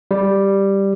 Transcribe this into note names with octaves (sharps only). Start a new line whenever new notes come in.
G3